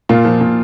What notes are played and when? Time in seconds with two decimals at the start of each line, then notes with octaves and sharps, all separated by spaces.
0.09 A#2 F4
0.25 F3
0.41 A#2